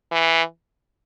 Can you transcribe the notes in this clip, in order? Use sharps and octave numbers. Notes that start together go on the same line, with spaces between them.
E3